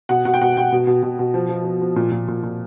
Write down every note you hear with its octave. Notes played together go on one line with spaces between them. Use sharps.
B2 F#5
B2 F#5
G5
B2 F#5
B2 G5
B2
B2
B2
B2
F3
F3
F3
F3
A#2
A#2
A#2
A#2